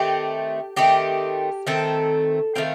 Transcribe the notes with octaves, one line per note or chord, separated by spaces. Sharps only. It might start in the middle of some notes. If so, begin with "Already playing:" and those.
Already playing: D#3 A3 C4 G4
D#3 A3 C4 G4
D#3 A3 C4 A4
D#3 A3 C4 F5